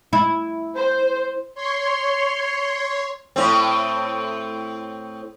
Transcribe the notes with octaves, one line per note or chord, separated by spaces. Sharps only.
E4
C5
C#5 C6
A2 C4